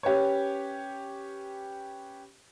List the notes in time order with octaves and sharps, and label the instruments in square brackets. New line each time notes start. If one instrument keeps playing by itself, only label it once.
[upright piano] C#4 G4 B4 C#5